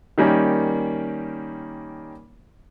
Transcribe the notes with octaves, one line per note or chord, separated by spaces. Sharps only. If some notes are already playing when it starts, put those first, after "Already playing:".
D#3 G3 A#3 C#4